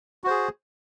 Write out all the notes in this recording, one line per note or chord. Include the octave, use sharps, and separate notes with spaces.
F#4 G#4 C5